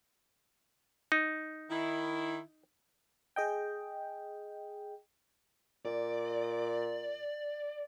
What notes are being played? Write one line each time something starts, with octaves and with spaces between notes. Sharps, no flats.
D#4
D#3 E4
G#4 D#5 G5
A#2 D5